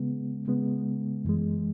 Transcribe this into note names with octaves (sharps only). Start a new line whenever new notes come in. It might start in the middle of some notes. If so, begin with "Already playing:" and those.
Already playing: C#3 G#3 B3
C#3 G#3 B3
F#2 E3 G#3